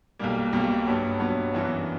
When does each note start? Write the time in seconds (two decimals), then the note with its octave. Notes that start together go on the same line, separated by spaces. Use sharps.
0.19 B1 B2 G3 A#3
0.53 B1 B2 G3 A#3
0.87 G2 F#3 B3
1.19 G2 F#3 B3
1.54 F#2 E3 B3 D4 F#4